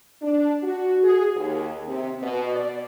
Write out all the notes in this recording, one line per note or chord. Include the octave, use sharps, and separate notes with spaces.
D4
F#4
G#4
D#2
C3
B2
D5